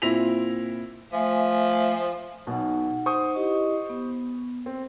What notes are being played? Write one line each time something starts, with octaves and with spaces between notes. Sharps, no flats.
A#2 C4 E4 A#6 B6 F7
F3 A3 E5 G#5
B1 B2 D#4 F#5
C5 C#6 D#6
E4 G4 D#5
B3
C4